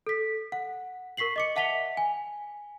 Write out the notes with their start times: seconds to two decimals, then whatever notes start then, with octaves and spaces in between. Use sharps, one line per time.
0.07 A4 B6
0.52 F#5
1.17 A#4 C#6 B6 C7 F#7
1.36 D#5 D6 C#7
1.56 E5 F#5 A5 B6 F7 G7
1.97 G#5